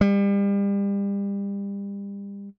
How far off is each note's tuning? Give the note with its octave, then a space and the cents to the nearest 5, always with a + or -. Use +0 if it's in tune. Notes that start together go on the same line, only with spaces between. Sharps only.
G3 +35